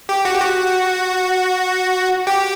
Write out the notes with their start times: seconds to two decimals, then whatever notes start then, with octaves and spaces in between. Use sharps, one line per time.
0.09 G4
0.25 F#4
0.34 G4
0.41 F#4
2.27 G4